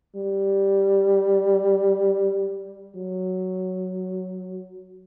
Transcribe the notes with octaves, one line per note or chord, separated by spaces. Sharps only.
G3
F#3